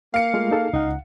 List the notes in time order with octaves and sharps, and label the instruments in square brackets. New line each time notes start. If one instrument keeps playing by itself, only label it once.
[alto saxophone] A#3 [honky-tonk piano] F5 C#7
[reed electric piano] G#3 A3 F4
D#4 G#4 A4
[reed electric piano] C#2 F#5 [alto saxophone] D#4